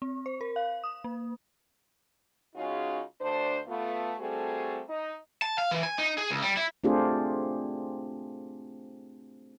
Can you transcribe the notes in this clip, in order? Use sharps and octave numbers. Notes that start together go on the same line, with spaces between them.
C4
C5
A#4
F5
D#6
A#3
C#3 G#3 C#4 D#4 F4 F#4
D2 D4 C5
A3 B3 F4
G3 A3 C4 F#4 G#4 A4
D#4 D#5
A5
F5
E3
G#5
D#4
G#4
C#2
G3
E4
A3 C4 D4 F4 G4 G#4